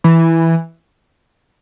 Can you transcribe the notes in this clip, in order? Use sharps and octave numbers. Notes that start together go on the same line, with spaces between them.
E3